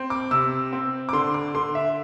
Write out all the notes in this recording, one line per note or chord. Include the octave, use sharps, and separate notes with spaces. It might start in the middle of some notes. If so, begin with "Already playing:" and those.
Already playing: C4
D6
C3 E6
C4
D6
D3 C6
D6
D3 C6
E5